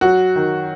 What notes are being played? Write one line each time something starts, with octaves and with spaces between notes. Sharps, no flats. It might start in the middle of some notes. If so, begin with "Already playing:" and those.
F#3 F#4
D#3